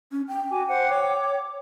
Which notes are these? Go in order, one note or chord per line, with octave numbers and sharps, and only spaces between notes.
C#4
G5
F#4 G#5 D6
C5 F#5
C#5 D6